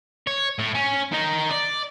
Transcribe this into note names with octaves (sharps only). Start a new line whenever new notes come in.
C#5
A2
C#4
D#3 D#4
D5